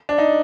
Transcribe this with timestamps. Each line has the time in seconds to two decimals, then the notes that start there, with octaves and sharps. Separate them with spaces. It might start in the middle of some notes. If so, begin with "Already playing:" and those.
0.09 D4
0.18 D#4